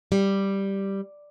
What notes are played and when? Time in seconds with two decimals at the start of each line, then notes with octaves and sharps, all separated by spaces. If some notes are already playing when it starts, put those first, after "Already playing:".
0.12 G3